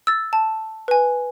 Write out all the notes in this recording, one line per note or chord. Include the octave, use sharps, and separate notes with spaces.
E6 A6
A5
B4 G#5